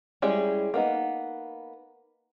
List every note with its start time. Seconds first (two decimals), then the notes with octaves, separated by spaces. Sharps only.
0.22 G3 G#3 C#4 E4 G#4
0.74 A#3 B3 D#4